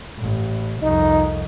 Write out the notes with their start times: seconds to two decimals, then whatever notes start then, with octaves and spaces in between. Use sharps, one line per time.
0.19 A1
0.82 C2 F2 D#4